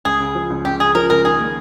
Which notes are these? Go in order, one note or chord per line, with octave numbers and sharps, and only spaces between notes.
C#2 G#4
C#3
F3
C#2
C#2 G4
C#3 G#4
F3 A#4
C#2 A#4
D#3 G#4
A#3